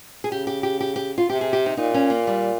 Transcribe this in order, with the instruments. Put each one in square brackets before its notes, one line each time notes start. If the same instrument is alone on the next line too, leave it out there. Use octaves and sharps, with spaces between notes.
[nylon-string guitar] G#4
[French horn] C#3 [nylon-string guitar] G4
[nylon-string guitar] G4
G4
G4
G4
F4
[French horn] C3 [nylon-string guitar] G4
[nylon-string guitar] G#4
G4
D#4
[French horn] A#2 [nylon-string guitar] D#4
[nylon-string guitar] C#4
A#3
G3